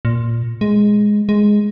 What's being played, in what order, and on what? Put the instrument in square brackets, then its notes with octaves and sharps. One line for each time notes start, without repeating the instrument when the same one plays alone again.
[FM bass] A#2
G#3
G#3